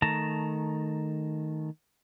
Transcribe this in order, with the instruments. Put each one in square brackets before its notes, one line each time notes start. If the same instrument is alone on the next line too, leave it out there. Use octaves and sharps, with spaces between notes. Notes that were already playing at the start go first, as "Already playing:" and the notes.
[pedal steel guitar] D#3 A3 A5 A#5